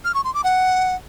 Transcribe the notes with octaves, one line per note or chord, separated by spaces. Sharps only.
F6
C#6
C6
D6
F#5